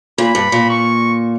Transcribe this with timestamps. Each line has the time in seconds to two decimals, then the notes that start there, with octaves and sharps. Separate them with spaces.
0.18 A#2 B5
0.35 G2
0.52 A#2
0.69 C#6